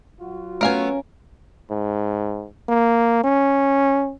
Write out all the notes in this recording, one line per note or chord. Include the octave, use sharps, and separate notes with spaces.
F#3 F4 F#4
A3 B3 C#4 A#4 F5 G#5
G#2
A#3
C#4